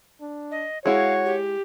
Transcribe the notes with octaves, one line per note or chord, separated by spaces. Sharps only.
D4
D#5
G#3 E4 F#4 C#5 F5
G4